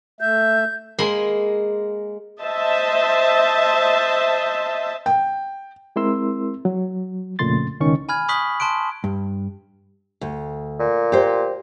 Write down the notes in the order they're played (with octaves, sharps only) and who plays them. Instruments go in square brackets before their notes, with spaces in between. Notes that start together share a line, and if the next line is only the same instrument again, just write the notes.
[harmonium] A3 E5 [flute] G6
[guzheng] G#3 A#3 B5 C6
[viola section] C5 D#5 E5 A5
[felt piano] G5
[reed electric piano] G#3 C4 E4 A#4 C6 E6
F#3
F2 A#2 C#3 A3 C6 A6
C#2 B2 D#3 C#4 D#4 C#6
[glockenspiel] G#5 B5 F6 G#6
B5 C#6 D#6 F#6 B6 F#7
A5 C6 F#6 D7
[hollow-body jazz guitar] G2
[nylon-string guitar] D2
[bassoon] A#2
[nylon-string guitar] G4 C5